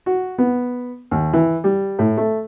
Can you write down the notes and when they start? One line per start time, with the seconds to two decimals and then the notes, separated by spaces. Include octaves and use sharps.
0.06 F#4
0.38 B3
1.11 D#2
1.33 E3
1.64 G3
1.99 A2
2.17 A3